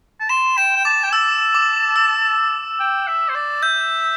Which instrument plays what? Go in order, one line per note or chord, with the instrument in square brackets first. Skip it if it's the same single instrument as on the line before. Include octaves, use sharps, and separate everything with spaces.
[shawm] A5
[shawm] C6 [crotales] E7
[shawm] G5 [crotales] E7
[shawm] G5
[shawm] A5 [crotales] D6
[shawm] G5
[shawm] A5 [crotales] E6
[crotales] D6
E6
[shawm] G5
E5
C5
D5
[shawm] E5 [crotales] G6